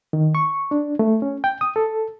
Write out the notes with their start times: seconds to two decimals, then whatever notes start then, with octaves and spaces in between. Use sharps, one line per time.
0.13 D#3
0.35 C#6
0.71 D4
0.99 A3
1.22 C#4
1.44 G5
1.61 D#6
1.76 A4